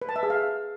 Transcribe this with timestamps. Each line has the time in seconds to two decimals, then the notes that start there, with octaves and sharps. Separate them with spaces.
0.02 B4
0.09 A5
0.16 E5
0.23 G#4
0.30 F5